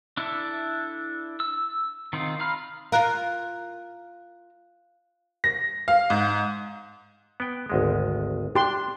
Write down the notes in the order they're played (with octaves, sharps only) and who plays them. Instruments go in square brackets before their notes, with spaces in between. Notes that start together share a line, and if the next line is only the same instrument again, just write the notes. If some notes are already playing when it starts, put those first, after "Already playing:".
[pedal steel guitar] D4 E4 A4 E5
E6
D#3 C4 D#4 F4
F5 A#5 B5 F6
[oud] F4 A#4 [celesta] F5 F#6
[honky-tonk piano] A#6
F5
G#2
[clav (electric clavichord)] B3 G5
G#1 D2 G#3
[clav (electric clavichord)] D4 [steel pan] G4 C6